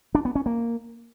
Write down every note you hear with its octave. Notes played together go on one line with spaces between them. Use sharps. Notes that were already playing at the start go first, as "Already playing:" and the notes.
D4
B3
C#4
A#3